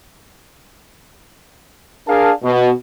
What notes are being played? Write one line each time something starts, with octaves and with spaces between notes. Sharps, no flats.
D4 G#4 A#4 F5 A5
B2